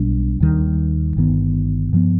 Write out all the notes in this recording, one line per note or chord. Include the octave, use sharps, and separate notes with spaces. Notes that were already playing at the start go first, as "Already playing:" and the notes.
Already playing: B1 B2 G3 D4
D#2 D#3 G3
G1 G2 D#3 B3
G2 F3 B3